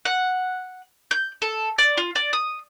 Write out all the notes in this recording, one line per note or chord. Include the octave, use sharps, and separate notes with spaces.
F#5
G6
A4
D5
F4
D5
D#6